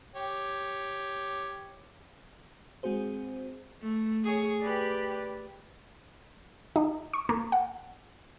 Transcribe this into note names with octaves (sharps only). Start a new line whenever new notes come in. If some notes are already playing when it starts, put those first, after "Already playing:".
G4 C#5
G#3 C4 F#4 G#4 C5
A3
G#4 C#5
G4 B4 D5
D#4
C#6
A#3
F#5